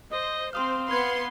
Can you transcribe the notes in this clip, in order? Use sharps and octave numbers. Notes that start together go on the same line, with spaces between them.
C5 D#5
C4 C5 F5 C6 D#6 F6
B3 B4 B5 C6 G#6